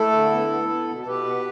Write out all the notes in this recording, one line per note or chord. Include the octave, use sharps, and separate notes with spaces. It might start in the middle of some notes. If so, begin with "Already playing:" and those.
Already playing: A3 E4 A4
D3
B3
B3
B3
B2
A4
B2 G4 B4
B3